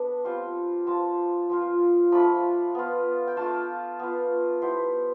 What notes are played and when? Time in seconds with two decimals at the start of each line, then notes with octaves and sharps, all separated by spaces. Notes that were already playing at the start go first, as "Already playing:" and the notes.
Already playing: B3 D4
0.24 G3 C4 F4
0.87 F3 C4 F4 A5
1.50 F3 C4 F4
2.12 F3 A3 D4 F4 B5
2.75 B3 F4
3.27 G5
3.37 A3 D4 F4 A5
3.99 B3 F4
4.62 G3 B3 E4 C5